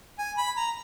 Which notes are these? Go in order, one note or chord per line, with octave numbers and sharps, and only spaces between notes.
G#5
B5
A#5